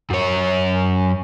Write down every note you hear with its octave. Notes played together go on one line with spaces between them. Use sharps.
F#2 C#5